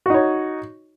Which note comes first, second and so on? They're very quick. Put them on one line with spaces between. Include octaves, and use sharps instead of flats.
F#4 D#4 C#5